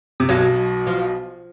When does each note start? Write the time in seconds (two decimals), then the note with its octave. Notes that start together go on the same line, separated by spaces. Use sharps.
0.20 C3
0.29 B1 B2 F#3
0.87 F3